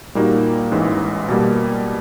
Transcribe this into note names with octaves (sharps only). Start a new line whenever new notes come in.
A#2 G3 A#3 D#4 F#4
A1 G#2 E3 G#3
B2 G3 A#3